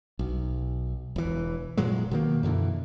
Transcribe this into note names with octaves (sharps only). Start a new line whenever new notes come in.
B1
E1 E3
F1 A#2 F#3 G#3
B2 D#3 A#3
F#2 B2 D3 E3